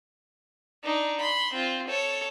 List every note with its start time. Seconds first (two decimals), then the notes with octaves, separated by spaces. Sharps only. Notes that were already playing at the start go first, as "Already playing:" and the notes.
0.83 D4 D#4
1.21 B5 C6
1.53 C4 F4
1.87 A4 C#5